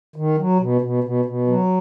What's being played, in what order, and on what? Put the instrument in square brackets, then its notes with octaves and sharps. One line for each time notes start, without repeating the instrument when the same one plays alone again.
[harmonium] D#3
F#3
B2
B2
B2
B2
F#3